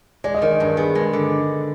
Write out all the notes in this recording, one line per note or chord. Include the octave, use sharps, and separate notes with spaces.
G#3 D5
D#5
D#3 D5
G2
B3 G#4
G#3
D3